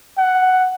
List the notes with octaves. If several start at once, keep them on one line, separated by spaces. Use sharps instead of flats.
F#5